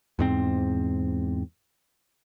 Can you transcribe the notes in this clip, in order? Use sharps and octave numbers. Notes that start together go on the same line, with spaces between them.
E2 G#2 C4